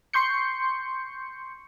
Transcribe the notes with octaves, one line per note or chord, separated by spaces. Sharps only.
C6 C#6 G6 C#7